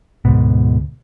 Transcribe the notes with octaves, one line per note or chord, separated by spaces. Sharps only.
D2 G#2 B2